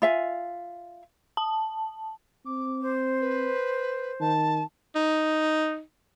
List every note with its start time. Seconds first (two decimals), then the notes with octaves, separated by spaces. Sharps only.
0.02 F4 E5 G#5
1.37 A5
2.46 C4 D6
2.82 C5
3.21 B4
4.20 D#3 A5
4.95 D#4